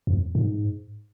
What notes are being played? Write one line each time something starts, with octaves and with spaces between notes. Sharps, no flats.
F2
G#2